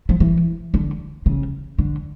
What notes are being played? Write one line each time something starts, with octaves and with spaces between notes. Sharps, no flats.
F3
E3
D3
C#3
D3